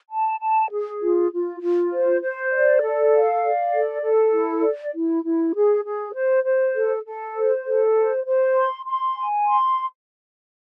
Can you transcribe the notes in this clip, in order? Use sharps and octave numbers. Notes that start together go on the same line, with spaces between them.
A5
A5
G#4
F4
F4
F4
C5
C5
D5
A4
F5
D5
A4
A4
E4
D5
E4
E4
G#4
G#4
C5
C5
A4
A4
C5
A4
C5
C5
C6
C6
G#5
C6